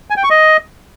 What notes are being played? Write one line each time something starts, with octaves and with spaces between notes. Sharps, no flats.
G#5
G5
C#6
D#5